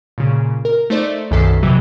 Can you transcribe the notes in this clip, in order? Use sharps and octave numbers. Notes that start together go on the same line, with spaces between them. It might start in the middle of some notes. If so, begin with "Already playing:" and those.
A#2 C#3
A#4
A3 D#4 C5 D5
B1 F#2 D#3 A4 B6 C7
F2 G#2 C3 E3 F#3